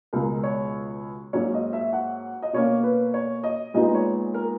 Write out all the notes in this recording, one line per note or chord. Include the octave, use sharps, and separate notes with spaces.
C#2 B2 G#3 A#4
C#5
G#2 F#3 A#3 C#4 C#5
D#5
E5
F#5
D#5
B2 A#3 C#4 C#5
B4
C#5
D#5
A#2 G#3 B3 D#4 D#5
C#5
A#4